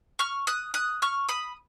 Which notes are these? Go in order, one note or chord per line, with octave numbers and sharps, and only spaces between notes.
C#6 F6
D#6 F#6
D#6 F#6
C#6 F6
B5 D#6